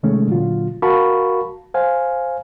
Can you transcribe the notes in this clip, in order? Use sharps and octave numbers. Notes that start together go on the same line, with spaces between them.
C3 D#3 G#3 A3 C#4
A#2 D3 F#3 F4
F#4 A#4 F5 A5 B5 C#6
C5 F5 G#5